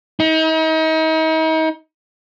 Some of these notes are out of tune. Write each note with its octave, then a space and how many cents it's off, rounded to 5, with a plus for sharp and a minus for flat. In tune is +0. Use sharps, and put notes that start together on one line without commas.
D#4 +40